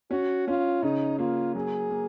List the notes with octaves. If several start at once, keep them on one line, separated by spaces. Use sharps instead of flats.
C#4 F#4
C#4 F4
C#3 D#4
A#3 F4
F#3 G#4
A#3